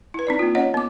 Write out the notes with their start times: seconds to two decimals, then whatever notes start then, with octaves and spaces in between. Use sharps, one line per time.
0.14 E4 B4
0.27 C4 D#4 D5
0.39 A#3 F4
0.55 C#4 C#5 D#5 F#5
0.74 B3 D6